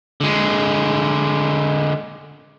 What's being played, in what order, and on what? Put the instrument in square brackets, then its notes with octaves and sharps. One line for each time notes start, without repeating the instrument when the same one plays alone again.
[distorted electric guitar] D3 G#3